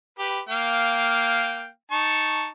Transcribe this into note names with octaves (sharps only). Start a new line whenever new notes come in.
G4 B4
A#3 F5 G5
D#4 A5 C#6